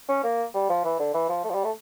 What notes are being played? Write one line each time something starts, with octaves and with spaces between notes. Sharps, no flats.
C#4
A#3
G3
F3
E3
D3
E3
F3
A3
F3
G3
A3